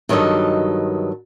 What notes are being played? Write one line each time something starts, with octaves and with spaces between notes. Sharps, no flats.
G2 D#3 F#3 A4 D#5